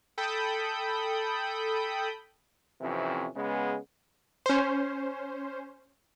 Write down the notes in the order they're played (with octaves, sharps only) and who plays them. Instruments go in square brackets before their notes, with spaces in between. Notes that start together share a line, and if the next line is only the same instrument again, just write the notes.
[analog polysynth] A4 G5 B5 D#6 G6
[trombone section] F2 C3 E3 C#4
C#3 G#3 B3
[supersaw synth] C#4 C5